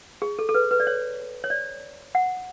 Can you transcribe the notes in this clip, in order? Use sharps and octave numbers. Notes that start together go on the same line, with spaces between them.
G#4
A4
A4
B4
B4
D5
C#5
C#5
D5
F#5